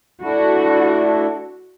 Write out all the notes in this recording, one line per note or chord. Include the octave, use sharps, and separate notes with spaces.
A3 D4 E4 F#4